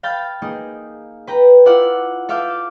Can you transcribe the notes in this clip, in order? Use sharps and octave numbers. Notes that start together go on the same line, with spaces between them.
F5 G5 B5 G6 A6
A#3 D#4 G#4
B4 G5 A#5
E4 F4 D5 E5 F#5
A4 E5 F5 D6 E6 G6